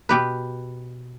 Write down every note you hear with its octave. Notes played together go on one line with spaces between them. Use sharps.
B2 G4 B4